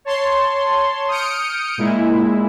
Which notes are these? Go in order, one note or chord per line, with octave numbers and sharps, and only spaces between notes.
C#5 A5 C6
D#6 F6 G6 C#7 D7
A#2 G#3 E4